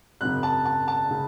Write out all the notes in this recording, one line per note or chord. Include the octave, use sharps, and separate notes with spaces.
G#1 F#2 C#3 F#6
A5
A5
A5
C#3